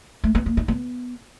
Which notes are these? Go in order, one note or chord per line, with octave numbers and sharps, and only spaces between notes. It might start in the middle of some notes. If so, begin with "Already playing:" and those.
A3
B3
A#3
D#4
B3